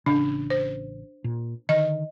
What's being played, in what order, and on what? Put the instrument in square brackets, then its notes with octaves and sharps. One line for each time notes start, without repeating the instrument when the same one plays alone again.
[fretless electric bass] A1 C#3 [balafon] D4
[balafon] C5
[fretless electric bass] A#2
[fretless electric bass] D3 D#3 [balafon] D#5